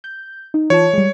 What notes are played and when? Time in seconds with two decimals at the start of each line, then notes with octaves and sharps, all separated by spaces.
0.04 G6
0.54 D#4
0.70 E3 F4 C#5 A5
0.93 G3 G#3